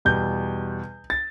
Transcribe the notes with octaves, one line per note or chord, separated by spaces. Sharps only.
E2 B2 G3 G6
A6